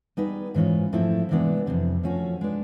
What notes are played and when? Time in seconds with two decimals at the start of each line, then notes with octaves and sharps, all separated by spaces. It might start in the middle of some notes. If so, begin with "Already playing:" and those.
0.17 G3 B3 D#4 G#4 B4
0.54 G#2 E3 G#3 C#4 F4
0.92 G#2 F3 A3 C4 E4
1.29 C3 E3 G#3 B3 D4
1.66 F2 C3 E3
2.03 F3 A3 C#4 F#4
2.41 G#3 B3 D4